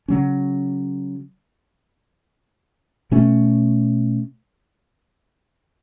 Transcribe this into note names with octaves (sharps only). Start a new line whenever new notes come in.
C#3 F#3 C#4
B2 A3 C#4